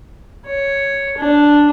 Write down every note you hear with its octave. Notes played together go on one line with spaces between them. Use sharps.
C#5
D4